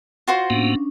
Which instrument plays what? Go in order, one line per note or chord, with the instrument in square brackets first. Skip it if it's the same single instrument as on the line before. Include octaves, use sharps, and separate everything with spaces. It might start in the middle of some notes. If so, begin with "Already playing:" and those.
[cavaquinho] F4 F#4 C5
[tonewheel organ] A2 A#3 B3 [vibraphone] C#4 D4